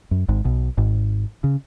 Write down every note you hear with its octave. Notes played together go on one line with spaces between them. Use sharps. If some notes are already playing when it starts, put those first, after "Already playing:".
F#2
G#1 G#2
B1 B2
G#1 G#2
C#3